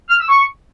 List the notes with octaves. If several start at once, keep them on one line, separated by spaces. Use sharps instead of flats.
F6
E6
C#6